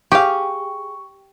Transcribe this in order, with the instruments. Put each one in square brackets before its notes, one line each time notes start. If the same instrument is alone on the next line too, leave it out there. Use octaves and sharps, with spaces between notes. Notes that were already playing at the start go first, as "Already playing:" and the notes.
[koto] G4 [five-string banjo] G#4 F5 [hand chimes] C#6